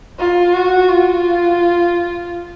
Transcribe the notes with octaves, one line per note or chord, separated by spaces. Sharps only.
F4
F#4
F4